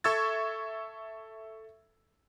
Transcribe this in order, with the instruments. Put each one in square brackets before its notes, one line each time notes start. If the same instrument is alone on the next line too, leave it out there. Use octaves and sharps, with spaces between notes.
[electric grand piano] A4 E5 C#6 E6 G#6 A6